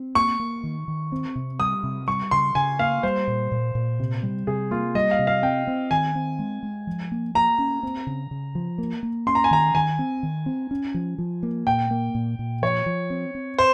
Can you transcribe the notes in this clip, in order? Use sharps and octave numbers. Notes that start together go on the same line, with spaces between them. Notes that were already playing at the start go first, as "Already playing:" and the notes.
Already playing: C4
A#3 C#6
A#3
D#3
D#3
C4
C3
G3 D#6
C3
G3 C#6
C#3 C6
C#3 G#5
A#3 F5
G3 C5
A#2
A#2
A#2
C3
G3
C3 G#4
A#3 F4
G3 D#5
F5
C3
F5
C4 G5
C4
D#3 G#5
C4
G#3
G#3
F3
A#3
A#3 A#5
C#4
C4
C#3
C#3
F3
A#3
A#3
C#4 C6
A#5
G#5
D#3 A#5
D#3 G#5
C4
D#3
C4
C#4
F3
F3
A#3
A#2 G5
A#3
A#2
A#2
F3 C#5
F3
C4
C4
C5